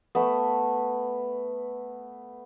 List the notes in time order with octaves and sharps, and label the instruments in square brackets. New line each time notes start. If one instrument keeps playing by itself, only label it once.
[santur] A3 B3